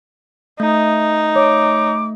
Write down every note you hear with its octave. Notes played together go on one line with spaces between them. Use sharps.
A3 D#4
C#5 D6